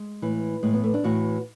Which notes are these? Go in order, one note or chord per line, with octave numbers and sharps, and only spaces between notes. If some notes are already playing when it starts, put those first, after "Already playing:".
Already playing: G#3
A2 E3
A2 E3 G#3
B3
A3
D4
A2 E3 F#4